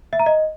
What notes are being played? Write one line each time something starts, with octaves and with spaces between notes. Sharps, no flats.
E5
A#5
D#5